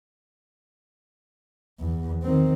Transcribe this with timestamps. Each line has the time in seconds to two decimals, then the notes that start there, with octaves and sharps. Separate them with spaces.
1.80 E2
2.23 D#3 C4